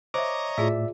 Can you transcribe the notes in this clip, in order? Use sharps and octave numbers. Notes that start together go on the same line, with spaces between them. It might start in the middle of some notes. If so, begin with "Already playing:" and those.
C5 C#5 D#5 E5 A#5 D6
A2 F4 G#4 D5 E5 A5